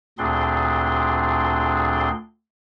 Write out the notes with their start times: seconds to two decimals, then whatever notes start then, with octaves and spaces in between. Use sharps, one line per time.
0.18 D2 A#2 C4 D4 G#4 C6